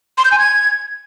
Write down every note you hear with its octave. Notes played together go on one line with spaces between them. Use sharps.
C6
G6
G#5
G#6